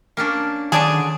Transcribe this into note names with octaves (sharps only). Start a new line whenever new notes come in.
A#3 C#4 D4
D3 D#3 F#3 D4 G#4 A5